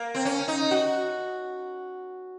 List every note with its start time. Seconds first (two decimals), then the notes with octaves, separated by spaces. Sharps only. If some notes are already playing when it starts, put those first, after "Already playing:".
Already playing: A#3
0.15 C4
0.25 C#4
0.48 D#4
0.71 F#4